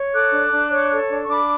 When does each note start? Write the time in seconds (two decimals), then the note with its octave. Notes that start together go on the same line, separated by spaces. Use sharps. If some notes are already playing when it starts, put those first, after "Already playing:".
Already playing: C#5
0.12 A4 D6 F#6
0.31 D4
0.51 D4
0.70 C#5
0.90 A4
1.09 D4
1.23 C#6
1.28 D4 B5 D6